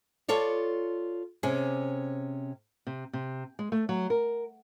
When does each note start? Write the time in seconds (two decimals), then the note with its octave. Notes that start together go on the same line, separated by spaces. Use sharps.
0.29 F4 A4 C#5 D5
1.43 C3 C#4 G#4
2.87 C3
3.13 C3
3.59 G#3
3.72 A3
3.89 F#3
4.10 A#4